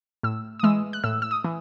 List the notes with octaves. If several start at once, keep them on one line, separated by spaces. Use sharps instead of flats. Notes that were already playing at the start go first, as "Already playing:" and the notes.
A2 E6
D#6
E3 G#3 E6
F#6
A2 E6
E6
D#6
E3